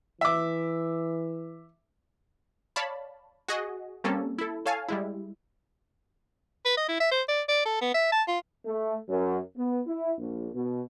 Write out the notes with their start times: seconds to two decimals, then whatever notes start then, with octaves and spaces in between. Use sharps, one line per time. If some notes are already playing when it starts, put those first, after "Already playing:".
0.21 E3 E5 D6
2.76 C#5 D5 F5 A5 B5
3.48 F#4 G#4 D#5
4.04 G3 A#3 C4 C#4 A4
4.38 E4 A4
4.66 A4 C#5 F5 G#5 A5
4.89 G3 G#3 E4
6.65 B4
6.77 D#5
6.89 E4
7.00 E5
7.12 C5
7.29 D5
7.49 D5
7.65 A4
7.82 B3
7.95 E5
8.12 A5
8.28 F4
8.66 A3
9.09 F#2
9.57 B3
9.87 E4
10.18 A#1
10.54 B2